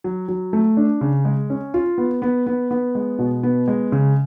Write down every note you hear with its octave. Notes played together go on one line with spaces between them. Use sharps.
F#3
F#3
A3
D4
C#3
G#3
C#4
F4
B3
B3
B3
B3
G#3
B2
B3
G#3
C#3